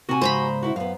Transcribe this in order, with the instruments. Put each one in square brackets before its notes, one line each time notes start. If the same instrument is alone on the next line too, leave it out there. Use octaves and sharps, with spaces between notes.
[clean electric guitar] C3 [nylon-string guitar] F#4 G4 G#5
[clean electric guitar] G#2 C#3 [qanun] C5 A#5 B5
[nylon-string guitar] E4 F#4
[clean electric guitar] F#2 [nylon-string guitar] B3 F5